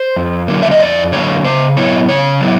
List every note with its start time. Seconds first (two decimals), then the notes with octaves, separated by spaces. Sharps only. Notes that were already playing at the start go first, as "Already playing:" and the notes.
Already playing: C5
0.16 F2
0.48 D3 F#3 A#3
0.63 E5
0.71 D#5
0.80 F2 D5
1.12 D3 F#3 A#3 C#5
1.44 C#3 C5
1.77 F#3 B3 E4 C#5
2.09 C#3 C#5
2.41 F#3 B3 E4